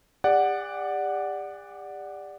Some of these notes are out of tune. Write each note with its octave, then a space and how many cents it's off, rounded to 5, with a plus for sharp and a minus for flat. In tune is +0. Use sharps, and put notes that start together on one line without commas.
G4 +40 D5 +0 F#5 +0